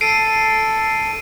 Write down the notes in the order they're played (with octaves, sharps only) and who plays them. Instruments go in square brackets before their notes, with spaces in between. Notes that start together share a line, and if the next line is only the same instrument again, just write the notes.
[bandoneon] A4 [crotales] C7 D7 D#7